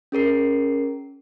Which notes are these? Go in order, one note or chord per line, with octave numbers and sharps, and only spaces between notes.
C#4 G#4 A#4 C7